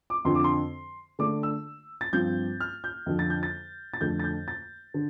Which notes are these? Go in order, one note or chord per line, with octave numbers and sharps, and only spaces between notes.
D6
F2 D3 F3 C4 C6
D6
C6
D3 A3 D4 D6
E6
A6
G2 F3 C4 G6
F6
G6
F2 D3 F3
A6
G6
A6
A6
F2 D3 A3 G6
A6
G6
A6
D3